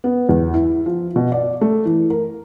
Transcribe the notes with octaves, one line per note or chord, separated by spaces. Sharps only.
B3
E2
E4
F3
B2
D5
A3
E3
A#4